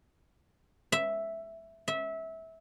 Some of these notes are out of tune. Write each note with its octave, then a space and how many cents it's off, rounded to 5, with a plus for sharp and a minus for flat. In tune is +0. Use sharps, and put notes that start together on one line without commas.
E5 +0
E5 -20